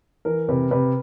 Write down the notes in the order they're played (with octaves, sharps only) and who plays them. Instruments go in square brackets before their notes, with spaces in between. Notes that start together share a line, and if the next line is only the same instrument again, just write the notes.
[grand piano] E3 [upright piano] A#4
[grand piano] C3 [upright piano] B4
[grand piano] C3 [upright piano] B4